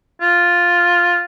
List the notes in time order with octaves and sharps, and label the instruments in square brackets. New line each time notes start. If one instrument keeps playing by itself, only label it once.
[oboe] F4